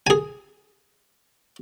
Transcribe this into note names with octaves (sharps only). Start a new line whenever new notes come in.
G#4 G#5